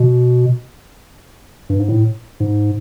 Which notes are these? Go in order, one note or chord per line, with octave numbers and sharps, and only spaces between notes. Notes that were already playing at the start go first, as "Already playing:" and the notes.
Already playing: B2
G2
G#2
A2
G#2